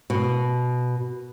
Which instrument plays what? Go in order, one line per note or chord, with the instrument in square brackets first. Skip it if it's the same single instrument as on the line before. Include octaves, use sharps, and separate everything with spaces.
[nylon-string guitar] B2